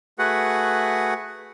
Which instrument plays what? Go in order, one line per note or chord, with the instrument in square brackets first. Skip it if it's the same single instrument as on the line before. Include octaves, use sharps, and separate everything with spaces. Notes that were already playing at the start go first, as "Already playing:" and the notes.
[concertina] A3 F#4 G#4 B4 F#5